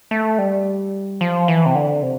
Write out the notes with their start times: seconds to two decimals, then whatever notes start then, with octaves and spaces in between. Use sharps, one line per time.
0.11 A3
0.38 G3
1.21 F3
1.48 E3
1.66 C3
1.75 D3
2.03 C3